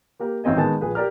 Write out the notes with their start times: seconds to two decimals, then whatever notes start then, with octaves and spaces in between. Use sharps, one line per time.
0.19 A#3 G4 A#4
0.44 A1 G#2 C4 D#5 G#5
0.57 D#3 G#3 B3 A5
0.81 A#1 G#4 B4
0.95 G4 A#4 D5 A#5 F6